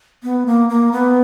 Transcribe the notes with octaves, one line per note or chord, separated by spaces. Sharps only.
B3
A#3
A#3
B3